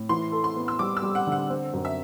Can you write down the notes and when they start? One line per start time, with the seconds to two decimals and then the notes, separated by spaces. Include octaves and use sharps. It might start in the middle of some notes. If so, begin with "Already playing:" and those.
Already playing: A2
0.09 E3 C6
0.32 A4
0.44 C6
0.56 B3
0.68 E6
0.79 G3 D6
0.97 E6
1.02 G3
1.15 F#5
1.27 D3 F#5
1.50 C4
1.73 F#2
1.85 E5